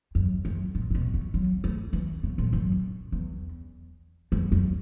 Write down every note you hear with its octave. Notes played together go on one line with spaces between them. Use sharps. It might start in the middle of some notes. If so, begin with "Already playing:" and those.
F#2
F#2
A2
A2
B2
C#3
F#3
A3
E3
C#3
A2
F#2
E2
F#2
F#2